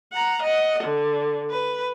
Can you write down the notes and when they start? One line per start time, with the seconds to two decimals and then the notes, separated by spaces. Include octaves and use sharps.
0.13 F#5 A#5
0.43 D#5 F#5
0.83 D3
1.50 B4